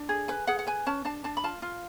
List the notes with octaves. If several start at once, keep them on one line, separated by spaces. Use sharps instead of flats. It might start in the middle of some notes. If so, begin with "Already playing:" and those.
Already playing: D4
G#4
B4 G#5
G#4 F#5
F#5
B4 G#5
C#4 A5
D4 A5
D4 A5
B5
F4 A5
F4